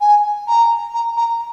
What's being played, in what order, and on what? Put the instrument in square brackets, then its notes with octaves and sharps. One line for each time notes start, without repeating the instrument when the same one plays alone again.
[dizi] G#5
A#5
A#5
A#5